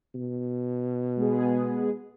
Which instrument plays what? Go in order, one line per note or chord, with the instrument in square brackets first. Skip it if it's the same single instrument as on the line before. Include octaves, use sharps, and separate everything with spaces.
[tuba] B2
[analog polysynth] G#3 B3 G#4